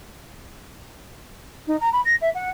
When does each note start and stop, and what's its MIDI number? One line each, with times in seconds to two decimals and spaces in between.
1.67 1.76 63
1.80 1.89 82
1.92 2.01 83
2.05 2.15 94
2.21 2.30 76
2.34 2.50 78